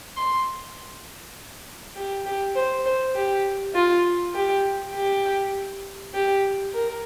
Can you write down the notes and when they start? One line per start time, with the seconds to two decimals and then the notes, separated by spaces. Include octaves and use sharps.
0.17 C6
1.96 G4
2.26 G4
2.56 C5
2.86 C5
3.15 G4
3.75 F4
4.35 G4
4.94 G4
6.14 G4
6.74 A#4